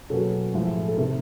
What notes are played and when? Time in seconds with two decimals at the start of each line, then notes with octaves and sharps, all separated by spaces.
0.10 B2 F#3 A#3 C#4 A4
0.53 A2 F3 G#3
0.88 A4
0.96 C3 D#3 G3 A#3 A#4